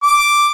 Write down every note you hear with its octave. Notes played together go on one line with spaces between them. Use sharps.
D6